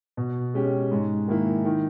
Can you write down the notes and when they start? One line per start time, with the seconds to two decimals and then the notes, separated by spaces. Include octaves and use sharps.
0.17 B2
0.54 G#3 C#4 G4
0.91 G#2
1.28 D#3 A#3 E4
1.65 D#3